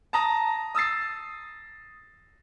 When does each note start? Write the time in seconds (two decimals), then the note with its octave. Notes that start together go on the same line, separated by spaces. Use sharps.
0.13 A5 A#5 D#6 A#6
0.75 D#6 E6 A6 C7